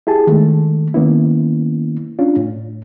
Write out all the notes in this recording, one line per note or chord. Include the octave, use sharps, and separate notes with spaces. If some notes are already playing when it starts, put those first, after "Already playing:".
E4 G4 G#4 A5
D#3 G#3 A3
D#3 A#3 B3 C#4 E4
C#4 D4 F4
A2